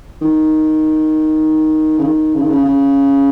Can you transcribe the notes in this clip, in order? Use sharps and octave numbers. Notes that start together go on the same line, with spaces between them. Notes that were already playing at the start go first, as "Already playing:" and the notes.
D#3
C#3
D#3
C#3
D#3
C#3
C#3